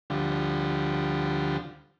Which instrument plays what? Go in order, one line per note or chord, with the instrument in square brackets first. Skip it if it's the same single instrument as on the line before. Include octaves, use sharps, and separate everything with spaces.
[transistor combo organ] D2 D3 F3 G3